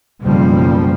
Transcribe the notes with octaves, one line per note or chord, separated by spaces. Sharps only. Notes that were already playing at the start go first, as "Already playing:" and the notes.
F#1 B1 F3 G3